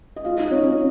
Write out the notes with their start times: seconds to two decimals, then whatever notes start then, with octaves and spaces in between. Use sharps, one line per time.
0.16 D#5
0.25 F4 F5
0.38 D#4 D#5
0.51 C#4 C#5
0.64 C#4 C#5